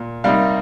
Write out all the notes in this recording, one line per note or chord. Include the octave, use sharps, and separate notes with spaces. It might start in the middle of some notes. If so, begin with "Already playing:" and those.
Already playing: A#2
C3 G3 A#3 D#4 F5